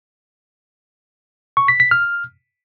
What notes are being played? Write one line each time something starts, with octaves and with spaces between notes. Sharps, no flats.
C#6
B6
B6
F6